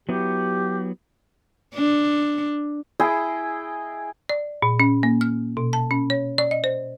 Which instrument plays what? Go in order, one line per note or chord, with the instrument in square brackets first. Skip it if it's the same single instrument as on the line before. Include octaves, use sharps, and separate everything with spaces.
[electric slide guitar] F#3 B3 E4 [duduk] G4
[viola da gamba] D4
[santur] E4 G#4 D#5 G5
[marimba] D5
A#2
C#4
A#3
F6
B2
A5
C#4
C#5
D5
D#5
C5